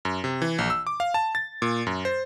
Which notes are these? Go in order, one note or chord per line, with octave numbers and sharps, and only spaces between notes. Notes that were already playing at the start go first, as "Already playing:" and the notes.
F#2
C3
E3
A#1
E6
D6
F5
A5
A6
A#2
F#2
C5